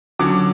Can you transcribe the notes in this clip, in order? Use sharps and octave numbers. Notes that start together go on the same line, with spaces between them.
D3 F#3 C#4 D6